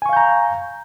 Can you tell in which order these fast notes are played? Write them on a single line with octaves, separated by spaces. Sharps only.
G#5 C#6 F5 G6 A#5